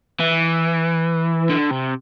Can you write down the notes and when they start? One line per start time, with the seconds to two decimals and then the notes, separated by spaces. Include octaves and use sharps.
0.20 E3
1.50 D3
1.71 C3